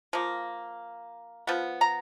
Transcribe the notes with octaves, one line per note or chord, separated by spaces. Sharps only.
F3 A#3
F3 B3
A#5